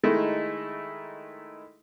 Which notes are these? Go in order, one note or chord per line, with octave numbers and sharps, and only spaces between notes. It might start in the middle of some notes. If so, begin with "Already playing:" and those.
D#3 G#3 A3 D#4 E4